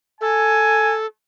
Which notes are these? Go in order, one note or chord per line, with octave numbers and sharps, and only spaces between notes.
A4 G#5